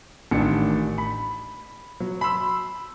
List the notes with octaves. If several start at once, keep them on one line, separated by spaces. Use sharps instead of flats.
A1 D#3 D4 C#7
B5
F#3
B5 C6 E6